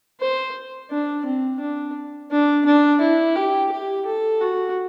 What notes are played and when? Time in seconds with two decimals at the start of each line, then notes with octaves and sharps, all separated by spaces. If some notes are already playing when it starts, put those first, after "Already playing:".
0.21 C5
0.91 D4
1.26 C4
1.61 D4
2.31 D4
2.66 D4
3.01 E4
3.36 G4
3.71 G4
4.06 A4
4.41 F#4